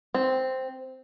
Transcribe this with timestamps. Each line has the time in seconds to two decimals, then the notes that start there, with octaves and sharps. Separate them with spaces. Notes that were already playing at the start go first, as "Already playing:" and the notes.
0.14 C4